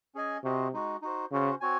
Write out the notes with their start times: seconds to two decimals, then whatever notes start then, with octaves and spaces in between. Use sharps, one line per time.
0.15 C#4 G#4 D#5 G#5
0.44 C3 F#4 C5 D#5
0.73 G#3 D#4 F#4
1.02 D#4 F#4 C5
1.32 C#3 C#4 F#4 C5
1.61 C4 F#4 C#5 G#5